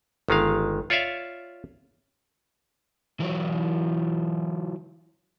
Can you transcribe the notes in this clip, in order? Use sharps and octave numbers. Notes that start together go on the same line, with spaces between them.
G1 D#3 G#3 F5
F4 C#5 D5 E5 F5
E3 F#3